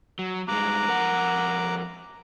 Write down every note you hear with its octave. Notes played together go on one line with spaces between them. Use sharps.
F#3
G2 G#3 A#5 D6 F#6
F2 A#4 F#5